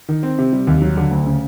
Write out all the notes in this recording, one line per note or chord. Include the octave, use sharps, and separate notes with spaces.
D#3
C4
C3
G3
D#2
F#3
D3
D2
C#3